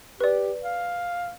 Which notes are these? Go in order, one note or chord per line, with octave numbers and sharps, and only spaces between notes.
G4 B4 D5
F5